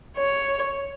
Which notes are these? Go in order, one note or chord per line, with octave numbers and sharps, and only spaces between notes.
C#5